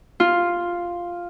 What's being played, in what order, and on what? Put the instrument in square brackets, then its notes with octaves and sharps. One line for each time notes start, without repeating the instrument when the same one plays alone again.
[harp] F4